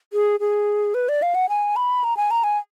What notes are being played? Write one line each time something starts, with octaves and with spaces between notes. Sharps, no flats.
G#4
G#4
B4
D5
F5
F#5
G#5
B5
A#5
G#5
A#5
G#5